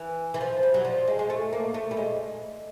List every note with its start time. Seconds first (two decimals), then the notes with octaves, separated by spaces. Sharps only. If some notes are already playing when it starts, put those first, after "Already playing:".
Already playing: E3
0.34 E3
0.41 F3
0.63 G3
0.74 F#3
0.85 F3
1.07 G#3
1.19 G#3
1.30 A3
1.53 A#3
1.74 A3
1.91 G3
1.97 G#3